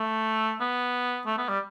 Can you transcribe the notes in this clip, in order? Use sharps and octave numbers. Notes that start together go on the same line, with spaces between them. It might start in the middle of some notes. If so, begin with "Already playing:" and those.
Already playing: A3
B3
A3
B3
G3